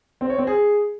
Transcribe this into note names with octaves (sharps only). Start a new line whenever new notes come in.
C4
C#5
C4
G#4